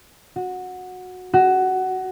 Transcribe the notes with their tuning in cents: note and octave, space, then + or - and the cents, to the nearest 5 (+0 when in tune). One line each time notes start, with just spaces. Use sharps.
F#4 -15
F#4 +15